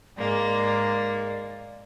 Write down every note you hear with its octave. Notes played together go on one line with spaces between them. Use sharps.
G#2 G#3 A#3 D5